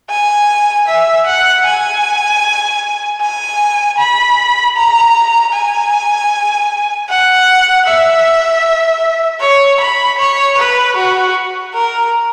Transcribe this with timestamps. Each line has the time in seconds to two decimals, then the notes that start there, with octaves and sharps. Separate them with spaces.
0.10 G#5
0.88 E5
1.26 F#5
1.66 G#5
3.21 G#5
3.98 B5
4.76 A#5
5.53 G#5
7.09 F#5
7.86 E5
9.41 C#5
9.80 B5
10.19 C#5
10.58 B4
10.96 F#4
11.74 A#4